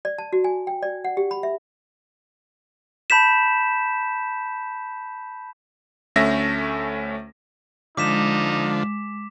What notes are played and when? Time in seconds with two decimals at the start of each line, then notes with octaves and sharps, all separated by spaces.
0.05 D5
0.18 A5
0.33 F#4
0.44 G#5
0.67 G5
0.82 D5
1.05 F#5
1.17 G4
1.31 B5
1.43 E5
3.10 A5 B5 G6 B6 E7
6.16 D2 A3 C#4 E5 A#6
7.97 D3 F3 G#3 D#4 D6 B6 E7